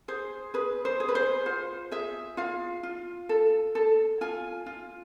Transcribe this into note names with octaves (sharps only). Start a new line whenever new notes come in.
G#4 C5
G#4 B4
C5
G#4
B4
C5
F4 C5
G#4 E5
F4 F5
F4
A4
A4
F4 G#5
F4